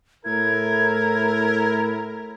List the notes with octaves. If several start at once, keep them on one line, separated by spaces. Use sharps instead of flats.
A2 E4 A#4 G#6